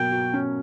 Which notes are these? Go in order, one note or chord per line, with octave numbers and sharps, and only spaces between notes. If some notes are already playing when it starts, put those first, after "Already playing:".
Already playing: B2 F#3 A#3 G5
F#4
C#4